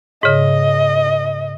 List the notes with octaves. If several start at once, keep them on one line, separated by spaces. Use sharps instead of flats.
G#2 C#3 D#5